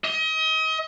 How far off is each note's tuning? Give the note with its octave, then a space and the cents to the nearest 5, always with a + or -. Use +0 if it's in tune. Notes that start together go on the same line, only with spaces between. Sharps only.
D#5 +35